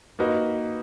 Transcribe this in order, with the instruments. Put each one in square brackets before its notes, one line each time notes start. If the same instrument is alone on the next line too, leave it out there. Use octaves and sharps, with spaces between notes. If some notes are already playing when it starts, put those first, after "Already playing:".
[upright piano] A#3 D#4 F#4 B4